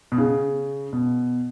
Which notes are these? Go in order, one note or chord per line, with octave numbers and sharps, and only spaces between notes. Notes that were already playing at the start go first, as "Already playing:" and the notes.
B2
C#3
B2